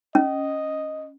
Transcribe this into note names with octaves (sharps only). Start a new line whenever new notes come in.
C#4 D#5